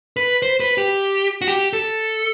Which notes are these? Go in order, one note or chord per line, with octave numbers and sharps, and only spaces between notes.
B4
C5
B4
G4
F#4
G4
A4